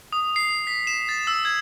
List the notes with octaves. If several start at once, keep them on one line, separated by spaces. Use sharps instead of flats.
D#6
C7
B6
E7
A6
E6
G#6